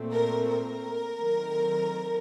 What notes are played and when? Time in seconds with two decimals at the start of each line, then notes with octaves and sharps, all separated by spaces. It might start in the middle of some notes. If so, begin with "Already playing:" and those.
Already playing: A#2 A3 C4
0.12 A#4
0.47 A#4
1.17 D#3 F#3 A3 C4